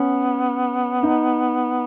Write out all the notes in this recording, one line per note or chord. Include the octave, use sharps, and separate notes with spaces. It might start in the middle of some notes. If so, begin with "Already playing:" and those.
Already playing: B3 C#4
D#4